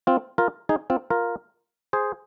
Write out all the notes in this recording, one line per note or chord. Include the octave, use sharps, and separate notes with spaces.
C4 F4
F4 A#4
D#4 G#4
C4 F4
F4 A#4
G#4 C5